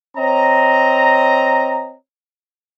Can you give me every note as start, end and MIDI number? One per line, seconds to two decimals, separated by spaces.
0.17 1.95 60
0.17 1.95 73
0.17 1.95 75
0.17 1.95 82